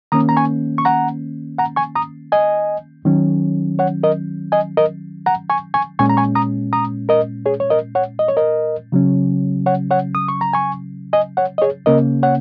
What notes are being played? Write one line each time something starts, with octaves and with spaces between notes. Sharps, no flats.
D#3 A#3 C#4 A#5 D#6
A#5
G#5 C#6
C#6
F#5 A#5
F#5 A#5
G#5 C#6
A#5 D#6
D#5 G#5
D#3 F#3 C#4
C#5 F#5
A#4 D#5
D#5 G#5
A#4 D#5
F#5 A#5
G#5 C#6
G#5 C#6
A#2 G#3 C#4 G#5 C#6
A#5
G#5 C#6
A#5 D#6
A#5 D#6
A#4 D#5
G#4 C#5
C#5
A#4 D#5
C#5 F#5
D#5
C#5
A#4 D#5
C#3 F#3 C#4
C#5 F#5
C#5 F#5
D#6
C#6
A#5
G#5 C#6
D#5 G#5
C#5 F#5
D#5
G#4 C#5
C#3 A#3 C#4 A#4 D#5
C#5 F#5